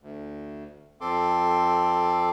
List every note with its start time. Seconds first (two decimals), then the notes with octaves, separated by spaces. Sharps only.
0.02 D2
1.01 F2 C4 A4 C6 D6